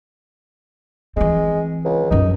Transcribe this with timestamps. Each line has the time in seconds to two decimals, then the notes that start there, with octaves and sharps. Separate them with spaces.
1.17 E3 G#3 C4
1.85 C#2
2.11 F#2 F3 D#4